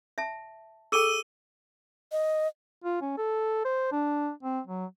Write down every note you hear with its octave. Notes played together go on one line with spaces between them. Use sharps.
E5 A5
G#4 A4 G5 E6 D#7 G7
D#5
F4
C#4
A4
C5
D4
C4
F#3